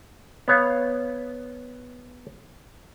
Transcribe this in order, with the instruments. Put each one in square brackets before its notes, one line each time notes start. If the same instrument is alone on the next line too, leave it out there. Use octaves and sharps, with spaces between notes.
[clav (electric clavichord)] B3 C#5 F5